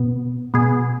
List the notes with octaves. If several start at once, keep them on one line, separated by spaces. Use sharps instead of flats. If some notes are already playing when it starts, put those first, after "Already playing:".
Already playing: B2 B3
B2 B3 G#4